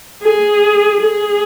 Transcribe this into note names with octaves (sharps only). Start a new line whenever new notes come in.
G#4
G#4